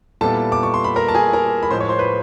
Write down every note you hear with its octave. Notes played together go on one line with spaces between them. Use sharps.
A#2 G3 B3 E4 A4 A5
D6
C#6
C6
B5
A#4 A#5
A5
G#4 G#5
A#4 A#5
B5
A2 F3 G#3 C5 C6
C#5 C#6
C5 C6
B4 B5